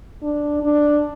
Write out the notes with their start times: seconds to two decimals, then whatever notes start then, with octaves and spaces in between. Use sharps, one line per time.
0.23 D4
0.63 D4